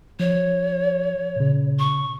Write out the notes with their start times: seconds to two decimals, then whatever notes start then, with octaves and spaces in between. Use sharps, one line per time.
0.20 F3 C#5
1.36 A#2 C#3
1.79 C#6